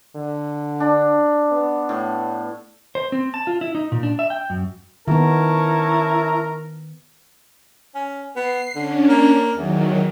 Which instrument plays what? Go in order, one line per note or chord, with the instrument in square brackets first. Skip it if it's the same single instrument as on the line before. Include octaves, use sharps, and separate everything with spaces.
[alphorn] D3
[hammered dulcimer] D4
[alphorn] B3
[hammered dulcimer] A2
[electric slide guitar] C5
C4
A5
F4
E4
D#4
A#2
D4
E5
G5
F#2
[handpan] D#3 B3 [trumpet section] C#4 A5 C#6 [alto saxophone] E4 [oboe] A#4
[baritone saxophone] C#4
[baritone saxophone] B3 [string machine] C7
[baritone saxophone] D3 [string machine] C#4 D4
[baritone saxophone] A#3
[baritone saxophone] E2 [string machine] D#3 F#3